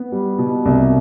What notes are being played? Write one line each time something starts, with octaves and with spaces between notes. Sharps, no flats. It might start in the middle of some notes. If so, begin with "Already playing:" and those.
Already playing: B3
G3
B2
C2